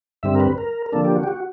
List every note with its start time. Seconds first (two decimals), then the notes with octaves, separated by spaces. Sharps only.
0.23 G2 D3 G3 C4 E5
0.35 A#4
0.40 B4
0.58 A#4
0.86 A#4
0.92 D3 F3 A#3 D4 A4
1.04 G4
1.16 F#4
1.23 G4
1.28 F#4